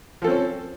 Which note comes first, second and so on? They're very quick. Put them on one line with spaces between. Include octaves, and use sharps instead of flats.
F3 A4 C4 C#4